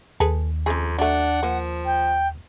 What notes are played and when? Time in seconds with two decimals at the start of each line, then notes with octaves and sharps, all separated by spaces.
0.20 D#2 G#4 A4 B4
0.66 F2 C#3 G#4
0.98 F#3 A3 D4 F#5
1.43 F3 A#3
1.85 G5